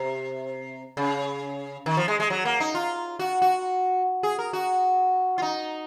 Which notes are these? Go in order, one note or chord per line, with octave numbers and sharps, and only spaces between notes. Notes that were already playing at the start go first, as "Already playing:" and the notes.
Already playing: C3
C#3
D#3
F3
G#3
G#3
F#3
A#3
D#4
F4
F#4
F#4
G#4
A#4
F#4
F4
D#4